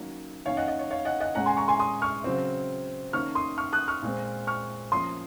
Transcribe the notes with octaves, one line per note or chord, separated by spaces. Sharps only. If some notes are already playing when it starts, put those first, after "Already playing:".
Already playing: D#3 F#3 A#3 C#4
D#3 A#3 C#4 C#5 F5
D#5 F#5
D#5
C#5
C#5 F5
D#5 F#5
D#5 F#5
A#2 G#3 C#4 F#5 A#5
G#5 C6
A#5 C#6
G#5 C6
C6 D#6
C#6 F6
C#3 F#3 C4
D#3 A#3 C#4 C#6 F6
C6 D#6
C#6 F6
D#6 F#6
C#6 F6
A#2 G#3 C4
C#6 F6
F3 A#3 C#4 C6 D#6